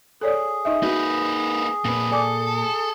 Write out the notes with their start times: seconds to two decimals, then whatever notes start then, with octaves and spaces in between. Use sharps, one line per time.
0.21 G#4 A4 C#5 D5
0.65 D#4 D#5 E5
0.83 A#3 D#4 F#4 B4
1.85 F2 A#2 A#3 B4
2.12 A4 D5 G#5 D6